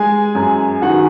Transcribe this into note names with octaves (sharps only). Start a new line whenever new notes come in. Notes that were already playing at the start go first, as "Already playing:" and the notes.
Already playing: G#3 G#4 G#5
F#2
D#3 F#4 F#5